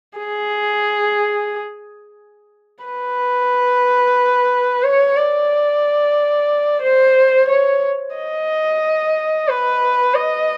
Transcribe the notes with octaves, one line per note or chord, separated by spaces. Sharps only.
G#4
B4
C#5
D5
C5
C#5
D#5
B4
D#5